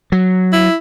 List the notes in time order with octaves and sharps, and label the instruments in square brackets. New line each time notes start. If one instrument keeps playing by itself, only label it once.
[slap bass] F#3
[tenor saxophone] E4